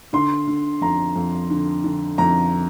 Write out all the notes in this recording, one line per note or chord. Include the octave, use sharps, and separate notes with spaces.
D3 C6
D3
F2 A#5
F2
D3
D3
F2 A#5